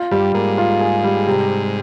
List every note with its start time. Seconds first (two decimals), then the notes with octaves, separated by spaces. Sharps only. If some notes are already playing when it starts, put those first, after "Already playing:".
Already playing: F4
0.11 G2 G3
0.34 G#2 A#3
0.58 F4
0.81 G#4
1.04 G3
1.27 C3